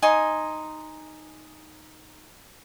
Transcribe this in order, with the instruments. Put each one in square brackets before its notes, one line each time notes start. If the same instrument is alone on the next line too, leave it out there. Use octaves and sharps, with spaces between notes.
[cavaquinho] D#4 G#5 C6